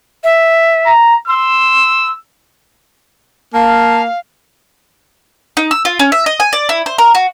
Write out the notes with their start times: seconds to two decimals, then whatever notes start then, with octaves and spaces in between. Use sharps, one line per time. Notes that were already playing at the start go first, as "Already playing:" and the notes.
0.24 E5
0.86 A#5
1.28 C6 E6
3.54 A#3 F5 A5
5.57 D#4
5.71 E6
5.85 F4
5.99 C#4
6.12 E5
6.26 D#5
6.40 G#5
6.53 D5
6.69 E4
6.86 C5
6.98 A#4
7.15 F#4